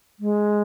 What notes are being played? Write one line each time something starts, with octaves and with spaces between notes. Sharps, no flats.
G#3